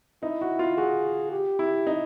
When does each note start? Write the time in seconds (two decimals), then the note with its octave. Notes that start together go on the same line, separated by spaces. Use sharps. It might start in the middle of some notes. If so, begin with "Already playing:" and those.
0.23 D#4 E4
0.41 F#4
0.59 F4
0.77 F#4 G#4
1.32 G4
1.59 E4
1.87 D#4